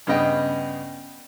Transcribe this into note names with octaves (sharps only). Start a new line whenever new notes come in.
G2 C#3 B3 D#5 G5